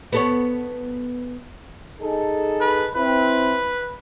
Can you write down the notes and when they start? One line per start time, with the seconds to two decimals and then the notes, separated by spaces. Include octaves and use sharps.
0.12 B3 A4 C#5
2.01 D#4 G#4 A4
2.61 B4
2.94 C4 E4 B4